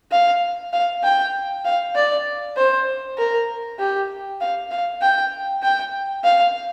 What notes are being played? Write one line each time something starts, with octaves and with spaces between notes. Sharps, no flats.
F5
F5
G5
F5
D5
C5
A#4
G4
F5
F5
G5
G5
F5